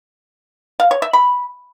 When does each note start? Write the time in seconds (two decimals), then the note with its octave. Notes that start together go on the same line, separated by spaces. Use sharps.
0.80 F5
0.91 C#5
1.02 E5
1.13 B5